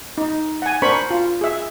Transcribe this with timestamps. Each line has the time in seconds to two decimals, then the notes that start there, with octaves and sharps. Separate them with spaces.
0.18 D#4
0.62 F#5 G#5
0.82 D4 A#4 C5 B5 C#6
1.11 F4
1.41 G#4 E5